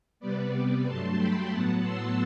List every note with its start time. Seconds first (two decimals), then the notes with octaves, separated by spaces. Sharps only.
0.20 C3 G3 B3 B4 D5
0.52 B4 D5
0.85 G2 F#3 A3 A5 C6
1.17 G5 B5
1.50 A2 F#3 B3 F#5 A5
1.82 C6 E6